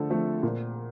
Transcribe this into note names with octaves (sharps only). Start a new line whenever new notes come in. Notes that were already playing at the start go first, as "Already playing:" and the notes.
Already playing: D3 F3 A3 A4
F3 A3 C4
A#2